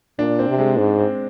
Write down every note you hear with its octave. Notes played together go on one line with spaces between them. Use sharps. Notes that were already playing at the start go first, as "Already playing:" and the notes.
A#2 D4
C4
C3
G#3
G#2
C4